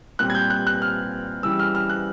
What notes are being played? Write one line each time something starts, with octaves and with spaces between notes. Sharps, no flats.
A#2 G3 C4 F#6
G#6
G6
F#6
F#6
F6
C#3 E3 G3 E6
F6
F6
F#6